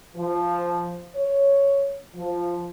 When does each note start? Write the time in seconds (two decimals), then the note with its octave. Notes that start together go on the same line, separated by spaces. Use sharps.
0.16 F3
1.16 C#5
2.15 F3